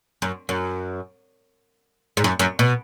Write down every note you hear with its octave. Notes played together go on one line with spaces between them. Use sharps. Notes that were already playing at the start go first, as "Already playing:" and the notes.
F#2
F#2
G#2
F#2
F#2
B2